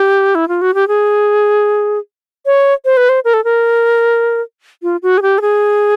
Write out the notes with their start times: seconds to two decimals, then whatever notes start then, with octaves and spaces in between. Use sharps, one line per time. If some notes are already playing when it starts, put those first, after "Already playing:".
Already playing: G4
0.35 E4
0.48 F4
0.62 F#4
0.74 G4
0.88 G#4
2.46 C#5
2.85 C5
2.97 B4
3.09 C5
3.25 A#4
3.34 A4
3.44 A#4
4.83 F4
5.03 F#4
5.18 G#4
5.22 G4
5.38 A4
5.41 G#4